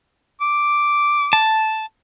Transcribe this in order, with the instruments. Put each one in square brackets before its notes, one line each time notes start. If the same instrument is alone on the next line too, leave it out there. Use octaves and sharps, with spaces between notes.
[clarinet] D6
[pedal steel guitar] A5